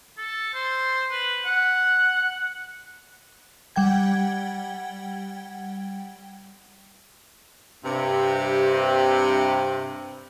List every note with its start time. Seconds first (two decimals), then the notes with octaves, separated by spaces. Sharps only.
0.18 A4
0.54 C5
1.11 B4
1.45 F#5
3.76 G3 F#5 G5 G#6
7.84 G2 C3